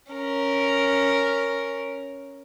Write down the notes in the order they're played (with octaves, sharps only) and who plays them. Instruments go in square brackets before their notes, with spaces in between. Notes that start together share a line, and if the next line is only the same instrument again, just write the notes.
[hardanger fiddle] C#4 A#4